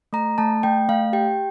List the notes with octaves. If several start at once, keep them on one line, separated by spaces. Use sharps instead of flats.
A3 A#5
A3 A5
A3 G5
A3 F5
G4 G5